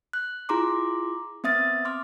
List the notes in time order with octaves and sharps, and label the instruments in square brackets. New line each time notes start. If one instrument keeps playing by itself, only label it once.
[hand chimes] F#6
E4 F4 G#4 A#5 C6 D6
B3 C4 E5 D#6 A6
C6 D6 F6